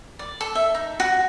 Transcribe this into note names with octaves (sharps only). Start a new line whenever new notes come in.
D5
A4
E5
D#4
F#4